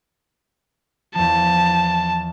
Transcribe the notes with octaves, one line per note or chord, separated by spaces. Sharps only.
E2 F3 A5